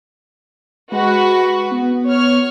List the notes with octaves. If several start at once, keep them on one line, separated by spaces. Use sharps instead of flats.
G#3 F#4 B4
B3
C#5 F6